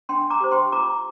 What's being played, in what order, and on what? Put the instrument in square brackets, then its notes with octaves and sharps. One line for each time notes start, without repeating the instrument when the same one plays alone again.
[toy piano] D4 G5 C6
A#5 D6
G4 C5
G5 C6
F4 A#5 D6